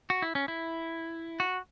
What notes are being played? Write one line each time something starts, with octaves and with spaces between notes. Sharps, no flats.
F#4
E4
C#4
E4
F#4